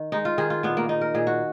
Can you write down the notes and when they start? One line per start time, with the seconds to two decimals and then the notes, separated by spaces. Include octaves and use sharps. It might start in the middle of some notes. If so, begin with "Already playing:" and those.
Already playing: D#3
0.12 G#3 D#4
0.25 F4
0.38 D#3 G#4
0.50 F4
0.63 A#2 B3
0.77 A#3
0.89 A#3 D#4
1.01 A#4
1.15 A#2 G#4
1.27 F#4